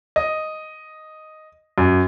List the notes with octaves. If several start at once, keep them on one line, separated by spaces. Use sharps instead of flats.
D#5
F#2